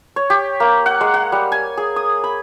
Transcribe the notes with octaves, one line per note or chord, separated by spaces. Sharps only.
C#5
G4
A#3
F#5
G#3
F#5
G3
G#5
G#4
D#6
B5